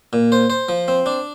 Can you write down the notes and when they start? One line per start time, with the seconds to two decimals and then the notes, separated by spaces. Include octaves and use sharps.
0.13 A#2
0.32 C5
0.50 C5
0.69 F3
0.88 C4
1.06 D4